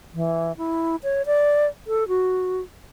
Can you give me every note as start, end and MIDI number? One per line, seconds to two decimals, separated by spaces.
0.14 0.56 52
0.57 0.96 64
1.03 1.22 73
1.26 1.67 74
1.87 2.08 69
2.08 2.61 66